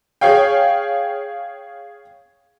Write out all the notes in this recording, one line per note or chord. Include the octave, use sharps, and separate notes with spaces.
G#4 C#5 F5 G5